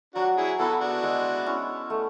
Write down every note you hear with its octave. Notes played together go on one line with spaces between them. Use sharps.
F#3 D4 F#4
E4 G#4
B3 E4 F#4 A4
D4 F#4
G#3
C#4 E4
A3